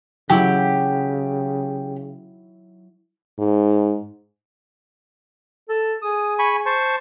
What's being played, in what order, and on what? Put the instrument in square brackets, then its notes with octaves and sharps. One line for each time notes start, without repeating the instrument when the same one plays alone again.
[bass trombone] C#3 [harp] F#3 E4 [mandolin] G4
[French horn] G#2
[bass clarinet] A4
[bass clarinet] G#4 [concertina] D#6
[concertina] G#5 B5 C#6
C5 A5 C#6